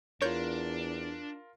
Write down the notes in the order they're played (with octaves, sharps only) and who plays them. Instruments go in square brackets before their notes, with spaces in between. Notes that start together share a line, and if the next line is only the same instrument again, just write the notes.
[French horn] E2 [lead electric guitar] D4 [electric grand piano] F4 A#4 [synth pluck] C#5 G6